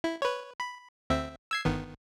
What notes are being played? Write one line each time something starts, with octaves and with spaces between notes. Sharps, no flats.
E4
B4 C#5
B5
D2 C4 E5
E6 G#6 C7
G1 D#3 B3